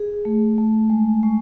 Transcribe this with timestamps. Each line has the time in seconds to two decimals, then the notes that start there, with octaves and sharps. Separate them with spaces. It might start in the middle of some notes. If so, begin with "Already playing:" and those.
Already playing: G#4
0.25 A3
0.58 A3
0.90 G#3
1.23 G#3